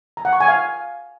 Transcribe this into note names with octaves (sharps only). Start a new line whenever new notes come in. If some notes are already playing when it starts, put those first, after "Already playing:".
A#5
F#5
C#6
G#5
F5